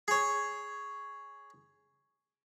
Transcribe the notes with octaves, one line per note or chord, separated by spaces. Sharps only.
G#4 C#5